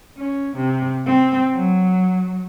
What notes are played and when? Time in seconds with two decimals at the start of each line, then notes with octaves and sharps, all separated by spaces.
0.17 C#4
0.57 C3
1.06 C4
1.54 F#3